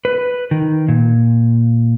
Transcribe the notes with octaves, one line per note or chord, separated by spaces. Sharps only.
B4
D#3
A#2